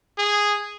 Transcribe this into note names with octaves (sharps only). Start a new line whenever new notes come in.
G#4